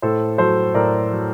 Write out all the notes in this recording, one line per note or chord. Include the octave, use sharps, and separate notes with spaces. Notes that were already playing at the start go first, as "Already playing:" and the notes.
A2 A4 C5
F#3 A4 C5
A2 A#4 D5
F#3